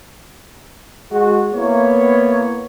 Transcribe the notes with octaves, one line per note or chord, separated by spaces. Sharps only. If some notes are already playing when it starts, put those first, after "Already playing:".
G#3 F#4 G#4
A#3 B3 E4 C#5